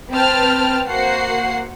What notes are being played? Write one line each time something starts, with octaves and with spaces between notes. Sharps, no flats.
C4 B4 G5 A5 F6
A#3 F#4 C5 F#5 C7